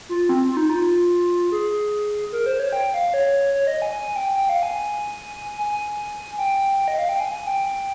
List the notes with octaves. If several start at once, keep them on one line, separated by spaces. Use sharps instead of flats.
F4
C4
F4
D#4
F4
G#4
A#4
C5
C#5
G5
F5
C#5
C#5
D#5
G#5
G#5
G5
G5
F5
G#5
G#5
G5
D#5
F5
G5
G#5
G#5
G5